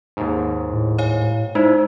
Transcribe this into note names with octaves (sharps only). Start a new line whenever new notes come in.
D#2 G#2
A2
C#5 F5 G#5
G#3 D#4 E4 C5 D5